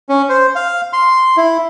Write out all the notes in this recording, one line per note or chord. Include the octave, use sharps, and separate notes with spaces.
C#4
C5
F5
C6
E4